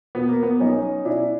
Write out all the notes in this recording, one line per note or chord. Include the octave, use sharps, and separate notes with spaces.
B2 B3
A#3
B3
B1 C#4 D#4
B2 D4 E4